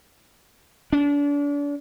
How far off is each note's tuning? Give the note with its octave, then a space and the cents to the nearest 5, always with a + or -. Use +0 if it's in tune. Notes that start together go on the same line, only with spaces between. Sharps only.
D4 -35